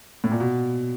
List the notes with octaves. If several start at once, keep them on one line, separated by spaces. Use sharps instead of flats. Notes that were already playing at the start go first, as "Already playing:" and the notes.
A2
A#2
B2